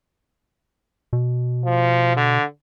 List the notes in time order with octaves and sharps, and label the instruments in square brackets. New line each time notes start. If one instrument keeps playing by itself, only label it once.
[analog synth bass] B2
[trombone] F3
D3